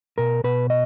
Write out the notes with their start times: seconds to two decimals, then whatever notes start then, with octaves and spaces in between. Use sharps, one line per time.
0.18 B2 A#4
0.44 B2 B4
0.70 D#5